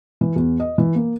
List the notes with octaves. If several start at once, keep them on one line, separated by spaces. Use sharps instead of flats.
E3
E2
D#5
E3
A#3